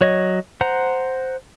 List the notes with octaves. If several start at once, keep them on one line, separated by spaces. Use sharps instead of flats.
F#3 C#5 D#5
C5 F#5 A#5